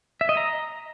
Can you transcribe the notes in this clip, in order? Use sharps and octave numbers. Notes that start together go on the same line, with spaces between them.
E5
D#5
A#5